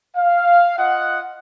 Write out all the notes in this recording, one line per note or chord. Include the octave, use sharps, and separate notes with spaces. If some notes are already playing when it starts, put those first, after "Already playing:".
F5
F4 D#5 F#5